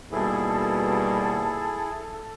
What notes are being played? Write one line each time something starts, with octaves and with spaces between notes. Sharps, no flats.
D#2 B2 G3 E4 G#4 A4